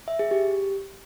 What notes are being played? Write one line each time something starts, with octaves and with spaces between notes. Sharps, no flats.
E5
G#4
G4